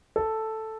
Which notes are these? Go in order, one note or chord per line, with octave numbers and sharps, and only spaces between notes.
A4